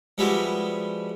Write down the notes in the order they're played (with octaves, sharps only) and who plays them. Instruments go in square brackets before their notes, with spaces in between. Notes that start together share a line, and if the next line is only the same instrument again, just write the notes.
[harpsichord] F3 G3 G#3 B3 E4 F#4